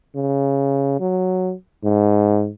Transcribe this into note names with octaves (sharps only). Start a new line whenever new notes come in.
C#3
F#3
G#2